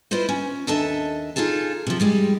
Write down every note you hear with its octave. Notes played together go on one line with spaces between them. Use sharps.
E4 F4 B4 C5 D#5
C#4
D#2 D4 A4 D#5 E5 A5
D#4 F4 G#4 A4 A5
C3 F3
G3 G#3 G4